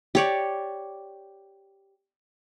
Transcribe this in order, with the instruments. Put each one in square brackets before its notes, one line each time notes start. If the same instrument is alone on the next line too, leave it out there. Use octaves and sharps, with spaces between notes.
[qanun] G4 C#5 D5